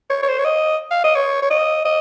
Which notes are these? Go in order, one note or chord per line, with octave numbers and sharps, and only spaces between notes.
C#5
C#5
C5
C#5
D#5
F5
D#5
C#5
C#5
D#5
D#5